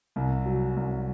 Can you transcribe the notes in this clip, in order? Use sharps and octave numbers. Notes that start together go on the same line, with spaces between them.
C2
F#3
C2